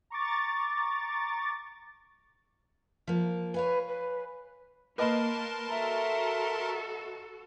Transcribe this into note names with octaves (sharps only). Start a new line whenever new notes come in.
A#5 C#6 D6 A6
F3 A#3
B4 C#5 F5 G#5
B4
A#3 A#4 B4 D#5 A5 B5 C6
F#4 A4 E5 A#5